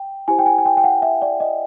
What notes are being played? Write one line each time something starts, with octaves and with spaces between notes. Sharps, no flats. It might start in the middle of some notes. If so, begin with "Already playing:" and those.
Already playing: G5
E4 G4 C5 G#5
G5
G#5
G#5
G5
G5
F#5
E5
D5
D#5